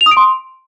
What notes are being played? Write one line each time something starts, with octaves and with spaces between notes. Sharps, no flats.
F7
D#6
D7
C6